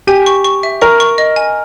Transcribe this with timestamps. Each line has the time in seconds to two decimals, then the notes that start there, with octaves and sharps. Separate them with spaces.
0.07 G4 G#5
0.26 C#6
0.44 C#6
0.63 E5
0.81 A#4 C#6
1.00 C#6
1.18 D#5
1.36 G#5